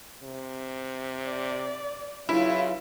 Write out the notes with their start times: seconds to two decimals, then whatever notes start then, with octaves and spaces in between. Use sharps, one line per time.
0.23 C3
1.25 D5
2.29 C#3 F#3 E4 F4 B4 E5